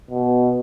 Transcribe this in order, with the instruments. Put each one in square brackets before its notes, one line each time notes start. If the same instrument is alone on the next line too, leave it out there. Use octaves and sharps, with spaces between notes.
[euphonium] B2